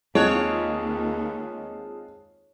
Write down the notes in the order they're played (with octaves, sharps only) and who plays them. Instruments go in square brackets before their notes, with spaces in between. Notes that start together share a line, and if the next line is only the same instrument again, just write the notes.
[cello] D#2 [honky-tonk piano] G#3 C4 F4 [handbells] G#4 A5 F#6 [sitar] C#5